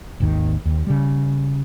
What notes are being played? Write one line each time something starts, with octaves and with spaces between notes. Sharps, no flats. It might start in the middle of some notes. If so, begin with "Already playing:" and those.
G#1 D#2 D#3
D#2
C#3 G3